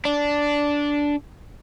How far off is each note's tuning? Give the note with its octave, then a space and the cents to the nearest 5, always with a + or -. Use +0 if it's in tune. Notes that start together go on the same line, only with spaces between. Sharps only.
D4 -10